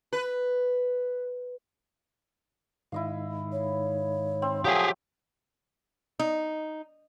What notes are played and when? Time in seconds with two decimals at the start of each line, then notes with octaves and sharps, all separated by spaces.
0.13 B4
2.92 G#2 D#3 E4 D#5 F5
3.52 C#5
4.42 C4
4.65 F3 F#3 A3 G4 G#4 D#6
6.19 D#4